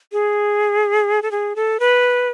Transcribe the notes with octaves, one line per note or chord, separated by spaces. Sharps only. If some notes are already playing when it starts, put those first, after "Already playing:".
G#4
A4
G#4
A4
B4